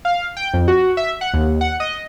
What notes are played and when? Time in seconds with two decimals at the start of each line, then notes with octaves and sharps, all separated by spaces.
0.05 F5
0.37 G5
0.54 F2
0.68 F#4
0.97 E5
1.21 F#5
1.34 D#2
1.61 F#5
1.80 D#5